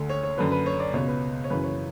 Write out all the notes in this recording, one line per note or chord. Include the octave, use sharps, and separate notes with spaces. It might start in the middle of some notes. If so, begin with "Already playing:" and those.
Already playing: D2 D3
C#5
C#5
F#2 D3 B4
B4
C#5
D5
C#2 B2 C#5
B4
C#5
F#2 C#3 E3 B4
C#5